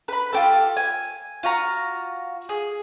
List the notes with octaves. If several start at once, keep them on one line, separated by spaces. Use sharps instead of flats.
B4 B5
F4 G4 A4
G#5
F4 F#4 A#5
G#4